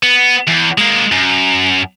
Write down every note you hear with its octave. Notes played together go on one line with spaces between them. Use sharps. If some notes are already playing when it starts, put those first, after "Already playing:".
B3
E2
G#3 A#3
F#2